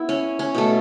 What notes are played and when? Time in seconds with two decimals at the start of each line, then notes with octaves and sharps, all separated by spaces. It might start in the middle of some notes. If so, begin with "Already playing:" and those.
Already playing: B3 E4
0.09 C#4
0.39 C#4
0.55 B2 A3